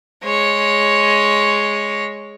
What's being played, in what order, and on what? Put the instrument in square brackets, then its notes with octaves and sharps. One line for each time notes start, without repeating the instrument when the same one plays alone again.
[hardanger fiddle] G#3 C#5